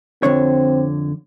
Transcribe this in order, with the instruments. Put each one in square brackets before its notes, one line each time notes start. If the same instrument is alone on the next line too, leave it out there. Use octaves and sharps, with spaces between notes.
[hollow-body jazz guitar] F2 D3 C#5 [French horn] C4